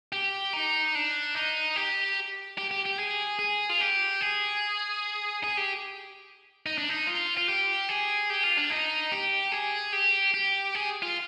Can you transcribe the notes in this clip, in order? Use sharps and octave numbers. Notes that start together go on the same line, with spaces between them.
G4
D#4
D4
D#4
G4
G4
G4
G4
G#4
G#4
F4
G4
G#4
G#4
G4
D#4
D4
D#4
F4
F4
G4
G#4
G4
F4
D4
D#4
G4
G#4
G4
G4
G#4
F4